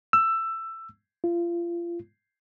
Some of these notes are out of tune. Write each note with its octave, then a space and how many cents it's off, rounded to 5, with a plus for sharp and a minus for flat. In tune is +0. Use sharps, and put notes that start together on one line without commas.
E6 +15
F4 -30